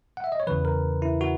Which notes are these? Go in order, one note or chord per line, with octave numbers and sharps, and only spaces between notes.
F#5
E5
D#5
C#5
E2 C#3 E3 B4
A#4
E4
F#4